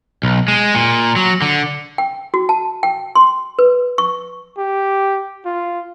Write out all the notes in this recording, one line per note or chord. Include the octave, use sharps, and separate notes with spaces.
B1
G#3
A#2
F#3
D3
G5
F#4
A5
G5
C6
B4
C#6
G4
F4